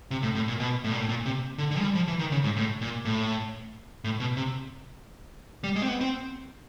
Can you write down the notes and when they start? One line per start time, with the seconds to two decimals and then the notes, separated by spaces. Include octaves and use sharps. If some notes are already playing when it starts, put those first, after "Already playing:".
0.11 C3
0.23 A2
0.35 A2
0.48 A#2
0.60 B2
0.84 A2
0.92 A#2
0.99 A2
1.09 A#2
1.26 C3
1.58 D3
1.71 D3
1.79 G#3
1.83 G3
1.95 F3
2.08 E3
2.19 D#3
2.32 C#3
2.44 G#2
2.56 A2
2.81 A#2
3.05 A2
4.04 A2
4.20 B2
4.37 C3
5.64 G3
5.76 G#3
5.82 C4
5.88 B3
6.01 C4